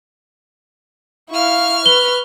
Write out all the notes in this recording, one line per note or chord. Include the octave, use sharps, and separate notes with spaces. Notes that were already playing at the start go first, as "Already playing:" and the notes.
E4 F5 C#6 F6
B4 G7